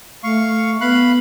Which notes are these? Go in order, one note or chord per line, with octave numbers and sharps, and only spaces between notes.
A3 F5 C#6
B3 F5 B5 F#6